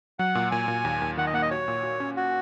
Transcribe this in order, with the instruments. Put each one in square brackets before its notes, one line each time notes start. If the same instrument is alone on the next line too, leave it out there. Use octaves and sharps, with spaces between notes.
[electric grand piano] F#3 [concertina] F#5
[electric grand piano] A#2
[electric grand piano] A#2 [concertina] G#5
[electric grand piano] A#2
D#2
D#2
[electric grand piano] D#3 [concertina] F#5
[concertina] D#5
[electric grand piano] A#3 [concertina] F#5
[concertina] D#5
[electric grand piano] F#4 [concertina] C#5
[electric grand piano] A#2
F#4
C#4
[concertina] F#4